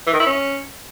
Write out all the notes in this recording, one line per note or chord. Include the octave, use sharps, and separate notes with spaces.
E3
D#3
E4
C#4